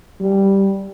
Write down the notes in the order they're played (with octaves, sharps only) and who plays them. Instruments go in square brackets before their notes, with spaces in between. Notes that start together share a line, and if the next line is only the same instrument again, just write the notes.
[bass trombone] G3